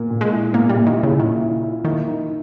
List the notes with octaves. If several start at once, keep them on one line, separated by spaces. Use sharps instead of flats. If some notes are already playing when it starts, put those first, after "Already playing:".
Already playing: A#2 A#3
A#2
G#3
E4
A#2 A#3
G3
A#2
D#3
E4
C#3
A#2 D#3
E4
E4
D#3 A#3
D#4